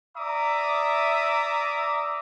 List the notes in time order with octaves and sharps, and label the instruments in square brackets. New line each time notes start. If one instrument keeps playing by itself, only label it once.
[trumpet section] D5 E5 A#5 D6 D#6